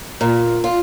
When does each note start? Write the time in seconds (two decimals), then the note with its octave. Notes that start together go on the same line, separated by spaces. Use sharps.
0.21 A#2
0.64 F4